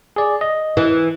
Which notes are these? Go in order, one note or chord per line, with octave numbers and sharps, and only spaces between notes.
G#4 D5
D#5
E3